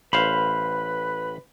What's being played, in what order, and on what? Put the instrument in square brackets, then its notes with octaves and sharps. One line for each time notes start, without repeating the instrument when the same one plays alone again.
[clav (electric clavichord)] A1 C5 F5 [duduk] B4 [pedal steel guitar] B5